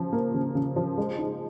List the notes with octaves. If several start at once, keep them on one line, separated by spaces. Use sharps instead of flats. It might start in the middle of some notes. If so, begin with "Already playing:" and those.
Already playing: C#3 F3
A#3
C#3
C#3
F3
G#3
D#4